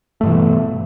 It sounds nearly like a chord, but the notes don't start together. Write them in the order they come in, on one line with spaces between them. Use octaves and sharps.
A3 G2 E3 B2